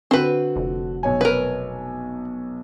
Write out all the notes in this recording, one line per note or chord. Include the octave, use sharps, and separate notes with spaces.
D3 C4 F#4 B4
F1
B1 C#5 G#5
A#4 B4